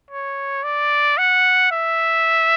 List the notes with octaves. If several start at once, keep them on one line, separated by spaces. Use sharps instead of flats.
C#5
D5
F#5
E5